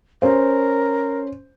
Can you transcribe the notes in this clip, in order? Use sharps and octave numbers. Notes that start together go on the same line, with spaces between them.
C#4 A#4 C5